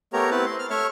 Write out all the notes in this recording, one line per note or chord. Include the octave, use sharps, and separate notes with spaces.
A3 B3 G4 A#4 C#5 A#5
B3 C4 E4 B4 A5
C6
F6
A3 C#5 E5 C#6 F6